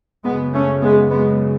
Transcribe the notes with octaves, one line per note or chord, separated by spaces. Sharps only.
F#2 C#3 G#3 B3
A3 C#4
G#3 B3
G#3 B3